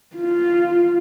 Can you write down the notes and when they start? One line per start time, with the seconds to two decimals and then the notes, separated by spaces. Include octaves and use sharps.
0.17 F4